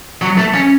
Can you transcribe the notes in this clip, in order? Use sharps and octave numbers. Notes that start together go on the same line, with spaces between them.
F#3
A3
C#4